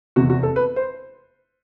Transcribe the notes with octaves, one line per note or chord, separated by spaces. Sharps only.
F1 E2 C3 F#4
F#4
A4
B4
C5